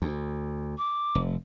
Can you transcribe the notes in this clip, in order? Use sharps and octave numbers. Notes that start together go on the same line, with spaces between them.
D2
D6
F1